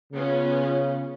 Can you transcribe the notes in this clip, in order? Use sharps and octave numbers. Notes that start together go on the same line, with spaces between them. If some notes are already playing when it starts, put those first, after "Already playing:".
C#3 B3 C#4 F4